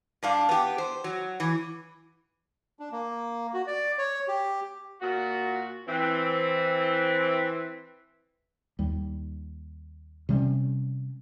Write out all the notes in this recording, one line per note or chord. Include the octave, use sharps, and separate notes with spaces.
G2 D4 F5
B3 G4
C5
F#3
E3
D4
A#3
F#4
D5
C#5
G4
A#2 F#4
E3 C4
D#2 G3
C3 G3 A#3 C#4